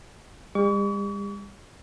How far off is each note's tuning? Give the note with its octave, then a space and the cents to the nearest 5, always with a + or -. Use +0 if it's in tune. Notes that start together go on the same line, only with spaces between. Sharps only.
G3 +45 C#6 +40